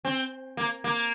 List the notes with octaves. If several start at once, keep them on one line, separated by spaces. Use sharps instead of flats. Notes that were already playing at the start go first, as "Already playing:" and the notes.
C4
A#3
A#3